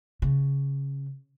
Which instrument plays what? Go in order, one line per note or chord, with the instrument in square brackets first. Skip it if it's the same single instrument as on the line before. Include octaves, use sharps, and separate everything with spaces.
[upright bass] C#3